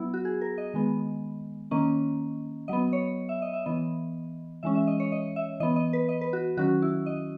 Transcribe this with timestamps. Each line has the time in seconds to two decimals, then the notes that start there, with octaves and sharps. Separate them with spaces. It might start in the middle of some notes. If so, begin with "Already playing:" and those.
Already playing: F#3 B3 E4
0.14 F#4
0.25 G#4
0.41 A#4
0.58 D#5
0.74 D#3 G#3 B3
1.71 D#3 A#3 C#4 D#5
2.68 F#3 B3 D#5
2.93 C#5
3.29 E5
3.42 D#5
3.53 E5
3.66 E3 B3 D#5
4.63 E3 G#3 C#4 E5
4.75 E5
4.87 D#5
5.00 C#5
5.12 D#5
5.36 E5
5.60 E3 B3 D#5
5.76 D#5
5.93 B4
6.09 D#5
6.21 B4
6.33 F#4
6.57 D#3 F#3 C#4 F#4
6.82 E4
7.06 D#5